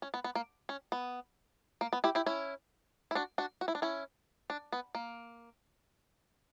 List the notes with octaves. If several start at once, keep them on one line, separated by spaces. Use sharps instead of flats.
C#4
B3
B3
A#3
C#4
B3
A#3
B3
E4 G4
E4 G4
C#4 E4
E4
D4 F#4
D4 F#4
F#4
E4
D4
C#4 E4
D4
B3
A#3